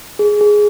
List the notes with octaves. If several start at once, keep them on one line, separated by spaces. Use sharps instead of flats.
G#4
G#4